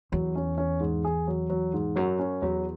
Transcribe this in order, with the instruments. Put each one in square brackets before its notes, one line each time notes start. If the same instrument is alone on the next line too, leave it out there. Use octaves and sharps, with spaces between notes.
[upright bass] E2 [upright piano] F#3
[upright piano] C#4
C#4
G#2
G#4
F#3
F#3
G#2
[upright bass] F#2 [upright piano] F#3
[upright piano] C#4
[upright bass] E2 [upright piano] F#3